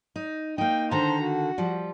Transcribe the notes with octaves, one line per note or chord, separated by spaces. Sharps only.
D#4
A#3 D#4 G5
D3 D#3 A4 C5 A#5
F#4
F3 G3